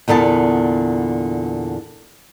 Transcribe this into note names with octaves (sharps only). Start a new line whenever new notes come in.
E2 A#2 D3 B3 A5